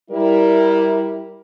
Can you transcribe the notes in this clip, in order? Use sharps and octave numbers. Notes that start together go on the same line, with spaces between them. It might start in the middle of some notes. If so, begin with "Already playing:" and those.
G3 E4 A#4